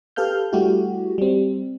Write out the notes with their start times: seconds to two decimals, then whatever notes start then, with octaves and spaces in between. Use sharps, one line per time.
0.16 G4 A4 B4 F5 F6 G6
0.53 G3 A3 E4 F#4 G4
1.18 G3 C4